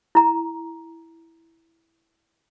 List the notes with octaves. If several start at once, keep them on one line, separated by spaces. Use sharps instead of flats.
E4 A#5